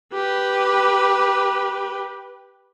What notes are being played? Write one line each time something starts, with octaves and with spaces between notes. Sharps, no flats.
G4 B4